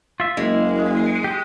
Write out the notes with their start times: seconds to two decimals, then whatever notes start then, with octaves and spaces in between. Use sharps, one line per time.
0.20 F4 E5
0.37 F#1 G#3 A#3 E4
1.24 G4 D#5